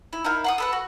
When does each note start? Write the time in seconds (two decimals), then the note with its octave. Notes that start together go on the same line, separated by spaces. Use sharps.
0.13 E4
0.24 D#4 E4 A#4 F5
0.44 F#5 C6 D#6
0.58 A4 B4 F#5
0.73 F#4